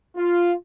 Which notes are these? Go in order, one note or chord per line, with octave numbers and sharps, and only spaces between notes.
F4